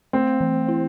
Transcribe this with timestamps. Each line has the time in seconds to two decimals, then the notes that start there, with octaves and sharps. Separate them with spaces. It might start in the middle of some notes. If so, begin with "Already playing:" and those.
0.13 A3 C4
0.41 E3
0.69 E4